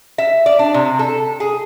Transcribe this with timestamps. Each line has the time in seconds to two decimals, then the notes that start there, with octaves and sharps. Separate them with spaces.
0.18 E5
0.46 D5
0.59 D4
0.74 C3
0.99 A4
1.40 G#4